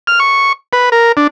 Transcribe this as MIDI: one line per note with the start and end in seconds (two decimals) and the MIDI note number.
0.07 0.19 89
0.20 0.53 85
0.73 0.90 71
0.92 1.12 70
1.17 1.27 62